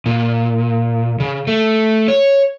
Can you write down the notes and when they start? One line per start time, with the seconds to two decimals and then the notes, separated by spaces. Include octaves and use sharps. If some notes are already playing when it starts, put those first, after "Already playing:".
0.06 A#2
1.20 C#3
1.47 A3
2.08 C#5